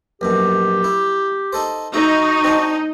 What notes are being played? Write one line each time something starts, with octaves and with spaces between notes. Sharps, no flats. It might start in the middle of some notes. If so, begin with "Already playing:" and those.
A#1 F#2 B2 G4
E4
D#4 A4 C5
D#4 F#4 E5
C4 D4